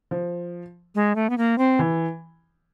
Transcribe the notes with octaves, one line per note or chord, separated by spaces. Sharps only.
F3
G#3
A3
B3
A#3
C4
E3